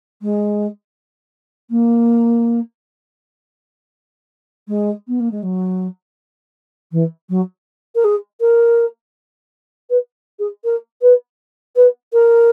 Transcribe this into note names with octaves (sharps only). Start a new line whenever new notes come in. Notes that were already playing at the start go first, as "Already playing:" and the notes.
G#3
A#3
G#3
B3
A#3
G#3
F#3
E3
F#3
A#4
G#4
A#4
B4
G#4
A#4
B4
B4
A#4